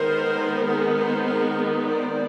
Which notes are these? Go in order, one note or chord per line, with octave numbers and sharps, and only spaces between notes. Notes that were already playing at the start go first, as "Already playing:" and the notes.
Already playing: D#3 G#3 B3 D#4 A#4 C5
G#4 A#4
A#4 C5
G#4 A#4
C5 D5